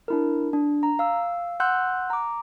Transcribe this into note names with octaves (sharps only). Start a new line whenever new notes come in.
D4 E4 A#4
D4
A#5
F5 E6
F#5 C6 E6 F#6 G6
A#5 D6